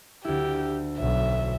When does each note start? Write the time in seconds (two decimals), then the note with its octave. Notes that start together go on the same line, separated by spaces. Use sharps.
0.25 D2 E4 G4
0.99 B1 E5